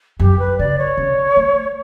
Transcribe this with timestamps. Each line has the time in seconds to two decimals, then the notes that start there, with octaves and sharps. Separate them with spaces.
0.20 F#2 G4
0.39 B4
0.58 C#3 D5
0.78 C#5
0.97 C#3
1.36 A3